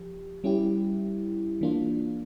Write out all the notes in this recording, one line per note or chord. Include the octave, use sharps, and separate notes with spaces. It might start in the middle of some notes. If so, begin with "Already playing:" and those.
Already playing: F3 G4
G3 C#4 E4 G4
E3 A#3 D4 F4